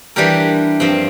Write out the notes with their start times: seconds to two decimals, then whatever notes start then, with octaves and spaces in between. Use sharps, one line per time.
0.16 E3 G3 D4 G4 A#4
0.80 G2 F3 C4